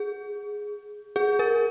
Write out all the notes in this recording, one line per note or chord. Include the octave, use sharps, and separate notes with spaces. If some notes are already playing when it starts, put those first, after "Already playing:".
Already playing: G#4
G#4
A#4